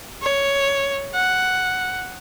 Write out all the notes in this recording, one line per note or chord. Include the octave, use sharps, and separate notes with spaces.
C#5
F#5